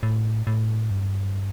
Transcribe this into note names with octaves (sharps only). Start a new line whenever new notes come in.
A2
A2
G2